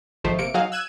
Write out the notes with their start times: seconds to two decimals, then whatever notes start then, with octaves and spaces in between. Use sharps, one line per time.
0.24 G#1 D#3 F3 A3 C5
0.38 C3 A#3 C#7 D7
0.54 F#3 D#4 F#4 G#4 F5
0.72 E6 F#6 G#6 D#7 E7